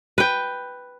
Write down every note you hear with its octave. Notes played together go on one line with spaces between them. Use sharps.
B4 G5